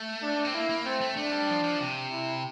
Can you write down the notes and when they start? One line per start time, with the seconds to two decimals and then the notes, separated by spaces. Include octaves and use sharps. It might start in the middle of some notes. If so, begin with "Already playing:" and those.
Already playing: A3
0.23 D4
0.45 C4
0.54 A#3 E4
0.70 A#3
0.85 A3 C4
1.01 A3
1.17 A3 D4
1.32 G3
1.49 F3
1.64 F3
1.80 C3
2.11 E4